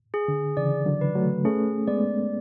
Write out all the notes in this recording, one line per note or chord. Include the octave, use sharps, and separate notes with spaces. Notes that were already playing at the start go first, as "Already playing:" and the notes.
G#4
D3
C#3 E3 D5
D3 F#3
B4
F#3 A3
A3 C#4 G#4
G#3 B3 D5